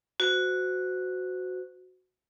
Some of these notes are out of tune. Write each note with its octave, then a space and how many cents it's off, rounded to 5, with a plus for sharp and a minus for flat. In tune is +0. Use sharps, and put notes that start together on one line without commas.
F#4 -5 C5 -35